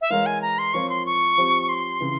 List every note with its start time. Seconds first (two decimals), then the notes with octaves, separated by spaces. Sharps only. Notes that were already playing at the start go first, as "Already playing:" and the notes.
0.01 E5
0.10 E3 G#3 E4 A#4 C#5 F5
0.26 G#5
0.42 A#5
0.59 C6
0.74 F3 C4 F4 A#4 C#5 C#6
0.89 C6
1.06 C#6
1.38 F3 C4 G4
1.69 C6
2.01 C#3 E3